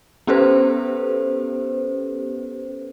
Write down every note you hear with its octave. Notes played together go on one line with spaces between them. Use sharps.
B3 C#4 G4 A4 B4 C5